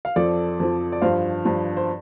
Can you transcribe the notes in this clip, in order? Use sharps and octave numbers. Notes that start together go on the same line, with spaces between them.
F5
F2 F3 A4 D5
F2 F3
D5
G2 F3 C5 F5
G2 F3
C5